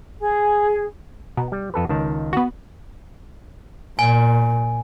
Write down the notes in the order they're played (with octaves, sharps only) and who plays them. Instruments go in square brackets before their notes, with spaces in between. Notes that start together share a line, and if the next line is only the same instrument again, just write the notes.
[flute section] G#4
[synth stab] B2 [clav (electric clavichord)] A#5
[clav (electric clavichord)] G3
F2 A4 B4
C#2 D#3 A5
[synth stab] B3 F#4
[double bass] A#2 [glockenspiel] G#5